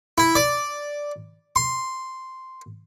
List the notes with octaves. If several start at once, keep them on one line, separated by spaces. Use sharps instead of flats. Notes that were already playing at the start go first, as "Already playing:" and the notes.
E4
D5
C6